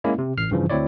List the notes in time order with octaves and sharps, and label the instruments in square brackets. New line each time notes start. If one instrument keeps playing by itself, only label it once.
[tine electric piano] G#3 A#3 C#4 E4
C3
A1 F6 C7
G2 C#3 E3 F3
D2 C4 E4 C#5 D5